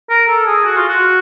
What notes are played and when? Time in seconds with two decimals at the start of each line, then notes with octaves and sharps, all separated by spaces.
0.10 A#4
0.28 A4
0.47 G#4
0.65 F#4
0.77 F4
0.89 F#4